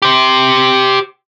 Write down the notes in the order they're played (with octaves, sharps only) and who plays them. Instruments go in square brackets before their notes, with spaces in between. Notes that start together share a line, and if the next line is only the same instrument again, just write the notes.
[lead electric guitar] G4 C5